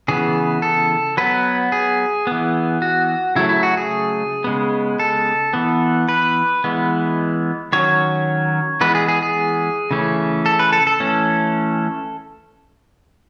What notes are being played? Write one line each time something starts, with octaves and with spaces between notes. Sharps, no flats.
C#3 E3 B3 G#4
A4
F#3 B3 B4
G#4
E3 B3
F#4
C#3 F#3 A3 E4
E4
F#4
G#4
C#3 G#3 B3
A4
E3 B3
B4
E3 G#3 B3
D#3 F#3 C#4 C#5
E3 G#3 B3 B4
G#4
G#4
G#4
C#3 E3 A3 C#4
A4
B4
A4
A4
E3 A3 C#4